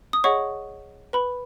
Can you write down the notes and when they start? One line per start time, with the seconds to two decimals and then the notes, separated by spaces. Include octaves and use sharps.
0.13 D#6
0.24 G#4 C#5 D#5 F#5 C#6
1.13 B4 B5